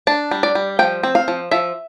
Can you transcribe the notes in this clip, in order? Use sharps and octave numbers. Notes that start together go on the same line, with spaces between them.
D4 A5
G3
D5
G3
F3 G5
C4
F5
F3
F3 E5